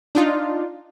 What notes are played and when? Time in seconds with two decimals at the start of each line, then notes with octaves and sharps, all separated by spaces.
0.15 D4 D#4 F4